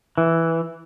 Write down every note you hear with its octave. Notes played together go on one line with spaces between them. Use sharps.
E3